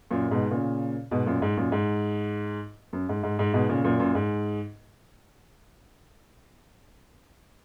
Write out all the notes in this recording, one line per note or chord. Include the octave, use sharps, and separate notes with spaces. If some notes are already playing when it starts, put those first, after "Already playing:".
F#2 A#2
G#2 B2
A#2 C#3
G#2 B2
F#2 A#2
G#2
F#2 A#2
G#2
F#2
G#2
G#2
G#2
G#2 B2
A#2 C#3
F#2 A#2
F#2 A#2
G#2